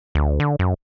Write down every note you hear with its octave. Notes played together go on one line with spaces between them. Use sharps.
D2
D3
F#2